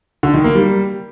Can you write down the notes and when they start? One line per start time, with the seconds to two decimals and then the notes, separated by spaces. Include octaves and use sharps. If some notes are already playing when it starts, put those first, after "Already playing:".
0.23 D3
0.34 D#3
0.44 A#3
0.55 G3